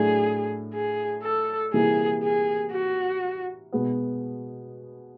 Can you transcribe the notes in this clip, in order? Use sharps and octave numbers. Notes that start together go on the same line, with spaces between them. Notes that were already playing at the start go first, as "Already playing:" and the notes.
Already playing: A2 F#3 A3 D4 G#4
G#4
A4
C3 E3 G3 A#3 G#4
G#4
F#4
B2 G#3 B3